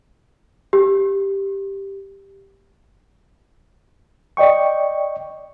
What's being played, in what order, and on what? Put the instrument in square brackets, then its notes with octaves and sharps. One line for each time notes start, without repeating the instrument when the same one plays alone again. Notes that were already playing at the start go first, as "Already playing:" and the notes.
[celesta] G4
[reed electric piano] D5 D#5 G5 C#6